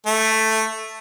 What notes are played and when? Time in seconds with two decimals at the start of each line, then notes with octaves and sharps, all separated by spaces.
0.06 A3